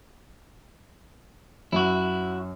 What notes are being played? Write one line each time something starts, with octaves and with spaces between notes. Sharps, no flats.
F#2 E4 F#4